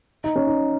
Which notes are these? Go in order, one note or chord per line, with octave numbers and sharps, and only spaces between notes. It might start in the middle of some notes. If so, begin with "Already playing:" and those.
D#4
C#4
D#4